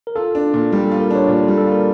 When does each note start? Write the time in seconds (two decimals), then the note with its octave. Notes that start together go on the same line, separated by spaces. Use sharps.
0.07 A#4
0.16 F4 A4
0.35 D4
0.54 A#2
0.72 G3 G4
0.87 F4 A4
1.00 A#4
1.11 D4 C#5
1.28 A#2 D5
1.43 A4
1.48 G3
1.58 A4
1.67 F4 A#4